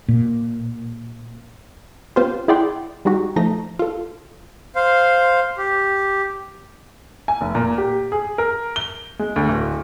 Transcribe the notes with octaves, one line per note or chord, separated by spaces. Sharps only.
A#2
B3 C#4 F4 G4 B4 C5
E4 G#4 D5 F#5 G5 C6
G3 G#3 D#4 F#4 G4
F3 A3 D#4 A#6
F4 A4
C5 F5
G4
G#5
F1
A#2
G4
G#4
A#4
G7
G#3
D2
D1